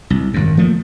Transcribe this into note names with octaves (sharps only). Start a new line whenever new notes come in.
C2
G#1 F#2
F3 A3 A#3